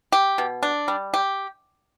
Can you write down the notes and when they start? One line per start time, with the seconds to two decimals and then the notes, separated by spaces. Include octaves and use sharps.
0.12 G4
0.38 B2
0.63 D4
0.88 G3
1.14 G4